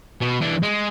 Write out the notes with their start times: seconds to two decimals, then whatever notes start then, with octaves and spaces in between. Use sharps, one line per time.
0.21 B2
0.41 E3 D4
0.63 G#3